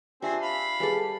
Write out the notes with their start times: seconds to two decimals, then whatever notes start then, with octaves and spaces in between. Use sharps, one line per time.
0.22 C4 D4 F4 G4 G#4 E5
0.42 F5 B5
0.80 G3 G#4 A4 B4 G#5